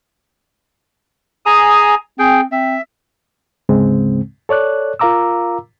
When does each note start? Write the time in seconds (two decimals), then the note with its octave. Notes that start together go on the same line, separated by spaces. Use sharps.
1.46 G#4 G#5 A#5 D#6
2.19 C4 G#4 G5
2.52 C4 E5
3.69 D2 G#2 C#3 G#3 C4
4.49 A4 C#5 D5 F#6
4.99 F4 A#4 F5 A#5 D6 E6